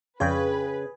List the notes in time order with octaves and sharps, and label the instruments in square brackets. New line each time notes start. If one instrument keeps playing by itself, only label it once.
[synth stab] F2 D4 F4 [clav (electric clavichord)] C#3 G5 [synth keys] G#4 [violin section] B4